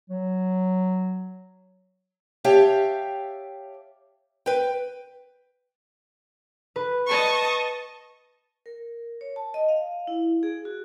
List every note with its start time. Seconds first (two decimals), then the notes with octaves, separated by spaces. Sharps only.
0.10 F#3
2.44 G4 C#5 E5 F5 G5 A5
4.46 B4 G5
6.76 B4
7.06 D#5 A5 C#6
8.66 A#4
9.21 C#5
9.36 A5
9.54 D#5
9.69 F5
10.07 E4
10.43 G#4
10.65 F#4